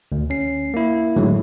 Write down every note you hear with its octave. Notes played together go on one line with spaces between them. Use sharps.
D2
C#4 C7
A#3 E4
A2 D3 D#3 F#3 G#3